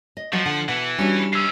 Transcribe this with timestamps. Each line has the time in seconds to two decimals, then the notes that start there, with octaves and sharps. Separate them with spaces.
0.17 D#5
0.33 F3 F#3 F#4 D#5 F#5
0.45 D3 F#5
0.68 B2 E3 F#5
0.98 G3 C#4 D4 F#4
1.33 G#2 C#4 E6 C7